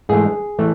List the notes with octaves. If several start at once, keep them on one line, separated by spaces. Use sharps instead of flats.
G#2 E3 A3 G#4
E3 A3